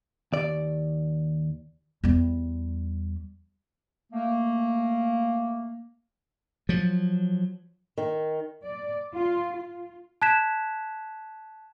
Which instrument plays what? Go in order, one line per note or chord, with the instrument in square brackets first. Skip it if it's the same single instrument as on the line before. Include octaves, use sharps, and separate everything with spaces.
[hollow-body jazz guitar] D#2 D5
[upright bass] E2 G3
[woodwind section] A3 A#3
[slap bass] F3 F#3
[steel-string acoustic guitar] D#3
[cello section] D5
F4
F4
[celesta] A5 F#6 G#6 B6 E7